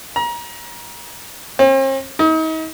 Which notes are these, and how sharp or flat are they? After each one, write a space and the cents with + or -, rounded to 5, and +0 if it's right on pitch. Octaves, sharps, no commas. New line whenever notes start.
A#5 +30
C4 +45
D#4 +40